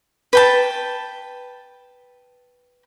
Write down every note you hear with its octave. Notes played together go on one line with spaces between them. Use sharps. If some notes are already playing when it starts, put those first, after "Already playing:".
B4 G5 A5